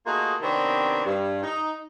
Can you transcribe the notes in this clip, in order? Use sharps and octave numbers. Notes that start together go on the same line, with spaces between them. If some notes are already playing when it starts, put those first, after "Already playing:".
A3 A#3 D#4 F4 F#4 G#4
C3 D#3 B3 C4 D4 C#5
G2
D#4